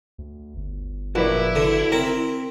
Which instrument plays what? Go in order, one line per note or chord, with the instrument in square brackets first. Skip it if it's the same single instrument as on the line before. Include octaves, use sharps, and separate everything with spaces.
[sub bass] D2
G1
[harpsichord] A#1 [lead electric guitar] E4 [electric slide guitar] F#4 B4 D5
[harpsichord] D3
[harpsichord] C4 [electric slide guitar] A#4